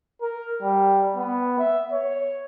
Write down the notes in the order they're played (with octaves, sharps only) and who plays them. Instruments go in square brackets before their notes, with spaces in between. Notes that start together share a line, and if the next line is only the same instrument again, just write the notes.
[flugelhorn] A#4
G3
B3
E5
C#5